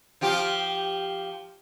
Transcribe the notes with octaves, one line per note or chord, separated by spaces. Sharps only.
F3 F4 G4